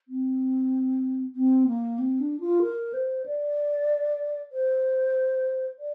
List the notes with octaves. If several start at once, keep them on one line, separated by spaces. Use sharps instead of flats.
C4
C4
A#3
C4
D4
F4
A#4
C5
D5
C5
D5